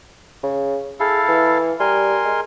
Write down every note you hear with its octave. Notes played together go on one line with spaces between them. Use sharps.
C#3
E4 G#4 A4 F5
E3
G3 A#4 G#5 C6
G#3